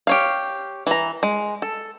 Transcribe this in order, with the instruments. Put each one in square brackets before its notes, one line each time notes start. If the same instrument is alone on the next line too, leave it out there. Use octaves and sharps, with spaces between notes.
[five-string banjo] G4 C#5 F5
E3 A#5
G#3
A4